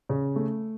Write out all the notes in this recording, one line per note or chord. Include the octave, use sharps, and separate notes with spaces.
C#3
A3